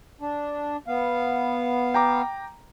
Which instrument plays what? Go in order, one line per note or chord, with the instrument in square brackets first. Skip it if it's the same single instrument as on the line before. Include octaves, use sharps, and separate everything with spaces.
[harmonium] D4
B3 F5
[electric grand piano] G5 A#5 D6